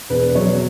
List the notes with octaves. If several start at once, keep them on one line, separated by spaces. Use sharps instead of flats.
E1 B4
F#3 C#5